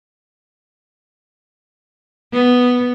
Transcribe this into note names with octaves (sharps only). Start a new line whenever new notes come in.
B3